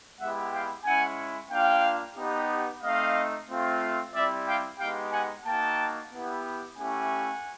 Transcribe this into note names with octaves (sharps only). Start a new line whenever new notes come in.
G#3 B3 E4 G4 E5 F#5
F5 G5
G#3 C#4 E4 F#5 G#5
A#3 D4 F4 F5 G5
B3 D#4 G4
A3 C4 D#4 D#5 F5
A3 C4 F4
G3 C4 E4 G4 D5 E5
F5 G5
G#3 B3 D#4 G4 F5 G5
F#5 G#5
A#3 D#4 F#4 G5 A5
B3 E4 G4
A3 C#4 E4 G4 F#5 G#5